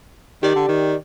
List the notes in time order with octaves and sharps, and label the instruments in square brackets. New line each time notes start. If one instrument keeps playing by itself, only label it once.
[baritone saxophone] D#3 [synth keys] G4 D5
[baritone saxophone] D3
D#3